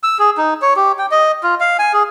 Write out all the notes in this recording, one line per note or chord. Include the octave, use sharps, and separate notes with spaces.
E6
G#4
D#4
C#5
G4
G5
D#5
F4
F5
G#5
G#4